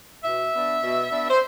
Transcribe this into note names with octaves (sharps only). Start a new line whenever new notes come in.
B2 E5
B3 D4
B2
B3 D4
C5